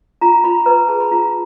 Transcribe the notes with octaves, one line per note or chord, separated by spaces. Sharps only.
F4 A#5
F4 B5
B4 A#5
G#4 A5
B5
F4 A#5